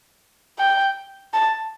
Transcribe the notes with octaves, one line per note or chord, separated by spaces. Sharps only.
G5
A5